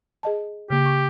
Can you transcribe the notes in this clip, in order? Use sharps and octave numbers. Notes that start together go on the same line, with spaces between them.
G#4 D#5 A5
C#3 A#3 G4
C#6